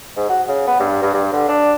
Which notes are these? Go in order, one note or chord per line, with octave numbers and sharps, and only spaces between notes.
G#2
F#4
C#3
B3
G2
G2
G2
D3
D4